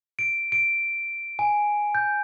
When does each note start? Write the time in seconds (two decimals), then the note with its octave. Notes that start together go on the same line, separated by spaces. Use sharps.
0.19 D7
0.52 D7
1.39 G#5
1.95 G6